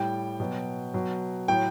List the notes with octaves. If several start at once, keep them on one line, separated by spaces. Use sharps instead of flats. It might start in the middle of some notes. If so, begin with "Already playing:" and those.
Already playing: A2 G3 G5
B2 F#3
B2 F#3
A2 F#3 G5